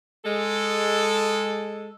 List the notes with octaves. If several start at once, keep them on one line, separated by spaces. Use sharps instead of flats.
G#3 A4